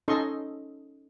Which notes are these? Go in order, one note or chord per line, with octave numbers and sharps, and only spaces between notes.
C#4 D#4 A4 D#5 C6 C#6